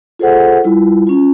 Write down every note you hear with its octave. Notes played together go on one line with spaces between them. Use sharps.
F4 G#4 A4 C5 F#5
G3 E4 F4
C#4 F4